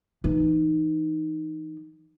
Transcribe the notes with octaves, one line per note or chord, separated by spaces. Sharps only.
E3 D#4